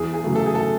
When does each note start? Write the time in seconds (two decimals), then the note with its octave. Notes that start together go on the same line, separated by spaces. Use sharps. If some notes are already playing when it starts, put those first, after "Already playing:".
Already playing: E2 G#4
0.14 G#4
0.24 C#3 F#3 A3
0.35 A4
0.46 G#4
0.55 A4